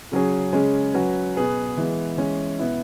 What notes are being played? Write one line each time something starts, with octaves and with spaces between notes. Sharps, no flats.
C#3 F#3 C#4 G#4
C#3 G#3 C#4
F#3 C#4 F#4 B4
B2 B3 G#4 B4
E3 G#3 B3
E3 G#3 C#4
B2 B3 E4